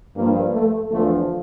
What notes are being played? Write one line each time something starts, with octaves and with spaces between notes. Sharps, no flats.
G2 F3 A#3
A3
E2 D3 F3 A3